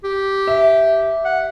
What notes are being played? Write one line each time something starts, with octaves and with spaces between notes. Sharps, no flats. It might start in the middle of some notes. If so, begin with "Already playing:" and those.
G4
E5
F#5